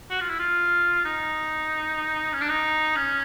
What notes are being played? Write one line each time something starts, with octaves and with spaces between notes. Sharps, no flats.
F#4
F4
E4
F4
D#4
C#4
D4
D#4
C#4